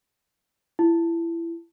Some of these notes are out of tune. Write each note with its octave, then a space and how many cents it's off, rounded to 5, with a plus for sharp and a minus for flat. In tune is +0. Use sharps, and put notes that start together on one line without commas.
E4 +25